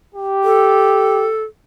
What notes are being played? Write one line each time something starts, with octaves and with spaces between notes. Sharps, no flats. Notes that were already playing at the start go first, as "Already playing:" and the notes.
G4
A4